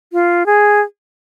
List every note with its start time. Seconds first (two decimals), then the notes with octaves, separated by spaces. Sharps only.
0.13 F4
0.46 G#4